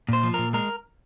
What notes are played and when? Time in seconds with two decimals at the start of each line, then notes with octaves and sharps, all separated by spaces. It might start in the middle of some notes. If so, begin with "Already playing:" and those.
0.09 A#2 C5
0.23 F3
0.34 A#2 A#4
0.53 G#3 A#4